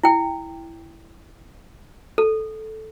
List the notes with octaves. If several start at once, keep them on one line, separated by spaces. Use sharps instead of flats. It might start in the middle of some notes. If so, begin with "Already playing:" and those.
E4 G5
A4